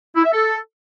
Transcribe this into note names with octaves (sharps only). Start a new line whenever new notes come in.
E4
E5
A4